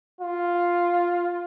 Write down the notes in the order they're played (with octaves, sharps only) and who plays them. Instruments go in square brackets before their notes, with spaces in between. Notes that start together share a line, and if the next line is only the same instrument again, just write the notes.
[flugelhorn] F4